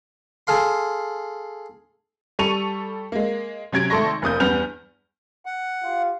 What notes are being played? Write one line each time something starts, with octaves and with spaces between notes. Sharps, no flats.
G#4 A4 F5 C6
G3 A4 C#6 C#7 D#7 F7
G#3 A#3
C3 F#3 C#4 G#6 D7
G#1 A3 A4 C6 C#6 A#6
F1 A#3 D#6 G6
E2 G2 B3 F6 G6 F7
F#5
F4 G4 F5